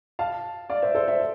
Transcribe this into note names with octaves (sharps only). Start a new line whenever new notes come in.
F5 A5
D5 F5
C5 E5
A4 C5
C5 E5